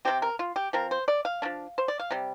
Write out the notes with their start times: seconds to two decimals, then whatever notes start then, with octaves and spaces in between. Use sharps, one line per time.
0.05 C3 F3 C4 G4
0.22 A#4
0.39 F4
0.56 G4
0.73 F3 C4 A#4
0.91 C5
1.08 D5
1.25 F5
1.42 F3 A#3 D4
1.78 C5
1.88 D5
1.99 F5
2.11 C3 G3